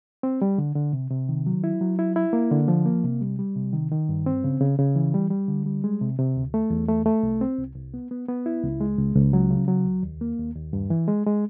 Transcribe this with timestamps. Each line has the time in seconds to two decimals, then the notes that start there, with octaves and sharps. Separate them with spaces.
0.23 C4
0.42 G3
0.58 D3
0.75 D3
0.93 C3
1.10 C3
1.29 D#3
1.46 F#3
1.64 E4
1.81 F#3
1.99 E4
2.16 E4
2.33 A#3
2.51 D3
2.68 F3
2.85 A#3
3.03 C3
3.21 G3
3.39 G3
3.55 C3
3.73 D#3
3.91 D#3
4.09 G2
4.26 C4
4.44 C#3
4.60 C#3
4.79 C#3
4.96 E3
5.14 G3
5.30 G3
5.48 D3
5.66 G3
5.84 G#3
6.01 C3
6.19 C3
6.37 D2
6.54 A3
6.70 E2
6.89 A3
7.06 A3
7.23 C2
7.41 C4
7.59 C2
7.76 C2
7.94 B3
8.11 B3
8.28 B3
8.46 E4
8.64 C#2
8.80 G#3
8.99 C#2
9.16 C#2
9.33 F#3
9.51 C#3
9.68 F#3
9.85 C#2
10.03 D#2
10.21 A#3
10.38 D#2
10.56 D#2
10.73 G2
10.90 E3
11.08 G#3
11.26 G#3